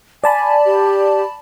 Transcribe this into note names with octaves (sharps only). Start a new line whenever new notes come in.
D5 G#5 A5 B5
G4